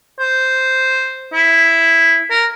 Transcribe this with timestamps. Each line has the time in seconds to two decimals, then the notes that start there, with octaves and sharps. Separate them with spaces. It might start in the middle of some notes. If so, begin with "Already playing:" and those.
0.20 C5
1.33 E4
2.31 A#4